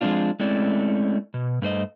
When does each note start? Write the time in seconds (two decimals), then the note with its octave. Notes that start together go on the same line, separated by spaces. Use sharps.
0.01 F3 G#3 A#3 C4 D4 F4
0.39 G#3 A3 C4 C#4 E4 D5
1.34 B2
1.62 G2 A3 C5 D#5